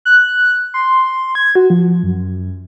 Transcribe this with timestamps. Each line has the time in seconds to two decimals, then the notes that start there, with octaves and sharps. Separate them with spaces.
0.05 F#6
0.74 C6
1.35 G#6
1.55 F#4
1.70 F3
2.03 F#2